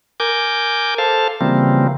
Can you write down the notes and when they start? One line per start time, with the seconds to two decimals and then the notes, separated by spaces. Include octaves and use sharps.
0.20 A#4 G#5 D6 G6
0.98 A4 C5 F5 A5
1.41 C#3 E3 F3 G3 A#3 C4